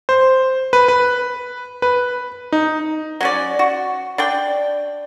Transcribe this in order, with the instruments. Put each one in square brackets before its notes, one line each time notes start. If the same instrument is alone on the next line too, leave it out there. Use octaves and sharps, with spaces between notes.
[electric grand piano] C5
B4
B4
B4
D#4
[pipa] F#3 C#4 D5
F#4
D4 D5 G5